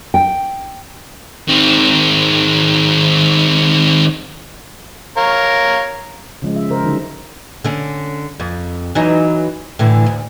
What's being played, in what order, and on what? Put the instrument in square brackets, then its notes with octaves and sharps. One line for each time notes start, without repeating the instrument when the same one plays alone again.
[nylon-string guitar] G5
[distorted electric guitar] D#3 C4
[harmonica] A#4 C#5 F5
[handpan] C#3 F3 G#3
E5
C#3 A#4 C5
D3 F3 F#3 D#4
[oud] D3 C#4
F2
E3 F#3 D#4
A2 D3 E3
D2